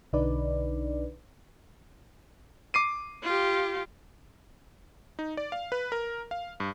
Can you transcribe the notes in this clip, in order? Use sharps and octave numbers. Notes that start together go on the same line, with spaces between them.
B1 D3 D4 D#4 B4 D5
D6 C7 D#7
F4 G4
D#4
D5
F5
B4
A#4
F5
G2